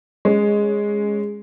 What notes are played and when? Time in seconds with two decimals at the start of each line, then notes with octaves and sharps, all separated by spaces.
0.25 G#3 C#4